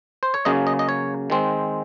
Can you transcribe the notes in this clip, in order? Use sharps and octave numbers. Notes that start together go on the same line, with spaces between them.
C5
C#5
C#3 F#3 A#3 C#4 D#5
D#5
D#5
C#5
D#3 G#3 C4